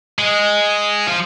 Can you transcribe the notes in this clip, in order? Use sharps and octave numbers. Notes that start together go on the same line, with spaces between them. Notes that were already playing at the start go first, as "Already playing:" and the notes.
G#3
F3